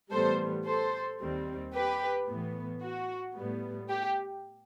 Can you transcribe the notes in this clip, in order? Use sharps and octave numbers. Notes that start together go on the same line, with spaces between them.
A2 E3 G3 B3 A4 C5
A4 C5
D#2 D#3 G3 C4
G4 B4
A2 E3 B3
F#4
A2 G3 B3
G4